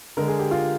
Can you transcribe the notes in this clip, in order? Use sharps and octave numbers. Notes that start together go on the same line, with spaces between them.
D3 G#3 A#4
G#4
G4
F4